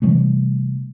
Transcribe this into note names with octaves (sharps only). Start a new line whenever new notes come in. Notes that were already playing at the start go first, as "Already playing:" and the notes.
C3 E3 G3 A3